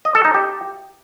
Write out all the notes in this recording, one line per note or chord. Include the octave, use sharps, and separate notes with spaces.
D#5
A4
D#4
G4